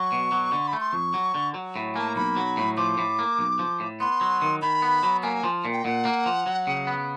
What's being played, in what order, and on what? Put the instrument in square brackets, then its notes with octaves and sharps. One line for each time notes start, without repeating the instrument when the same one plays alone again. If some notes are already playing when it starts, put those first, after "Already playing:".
Already playing: [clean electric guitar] F#3 [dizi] C#6
[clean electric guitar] B2
F#3
D3
[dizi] B5
[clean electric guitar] A3
[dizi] C6
[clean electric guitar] F2 [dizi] C#6
[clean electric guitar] F#3
D3
F#3
A2
[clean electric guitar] A#3 [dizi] G#5
[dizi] A5
A#5
[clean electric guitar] B1 [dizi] B5
[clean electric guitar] F#3
A2
[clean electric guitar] F3 [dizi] D6
[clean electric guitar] A2
A#3
B1
F3
A2
[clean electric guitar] B3 [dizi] C6
[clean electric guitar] F#3
D#3
[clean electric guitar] D#3 [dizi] B5
[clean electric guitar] B3
F#3
[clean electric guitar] A#3 [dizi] G#5
[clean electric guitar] F3
A#2
[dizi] G5
[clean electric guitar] A#2 [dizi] F#5
[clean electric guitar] A#3
F3
F#3
C#3
B3